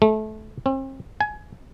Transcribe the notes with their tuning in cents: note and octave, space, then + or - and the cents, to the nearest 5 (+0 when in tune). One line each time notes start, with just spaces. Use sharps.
A3 -25
C4 +40
G#5 +20